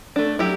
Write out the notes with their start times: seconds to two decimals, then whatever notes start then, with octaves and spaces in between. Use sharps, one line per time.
0.16 A3 D4
0.39 F#3 E4 G4